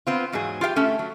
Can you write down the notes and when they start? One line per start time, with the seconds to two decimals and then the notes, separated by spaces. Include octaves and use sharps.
0.07 B3 C4 F4
0.32 E2 G#2 F#3 G#4
0.61 F4 G4 F5 G5
0.76 A3 C#4
0.99 F#3